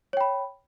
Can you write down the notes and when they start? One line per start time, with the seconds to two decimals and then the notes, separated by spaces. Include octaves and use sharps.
0.13 C#5
0.17 G5
0.21 B5